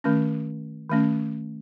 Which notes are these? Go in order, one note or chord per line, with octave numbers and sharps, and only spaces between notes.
D#3 A3 C#4
D#3 A3 C#4